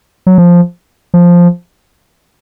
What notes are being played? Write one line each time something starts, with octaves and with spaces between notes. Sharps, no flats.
F#3
F3
F3